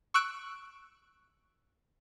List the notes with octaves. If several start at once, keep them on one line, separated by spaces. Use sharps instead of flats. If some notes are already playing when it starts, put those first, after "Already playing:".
C#6 E6 F#6 D7